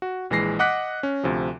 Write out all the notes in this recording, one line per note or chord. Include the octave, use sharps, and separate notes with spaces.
F#4
A#1 E3 G#3 A#6 C7
D#5 F#5 D6 F#6 B6
C#4
D2 C3 F3